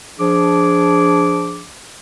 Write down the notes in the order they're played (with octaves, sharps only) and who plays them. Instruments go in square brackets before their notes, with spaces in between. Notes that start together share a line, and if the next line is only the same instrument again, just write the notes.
[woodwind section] F3 D4 G#4 D6